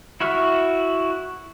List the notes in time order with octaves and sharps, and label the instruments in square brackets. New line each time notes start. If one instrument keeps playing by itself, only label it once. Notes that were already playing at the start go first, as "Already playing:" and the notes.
[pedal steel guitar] E4 F#4 E5 F6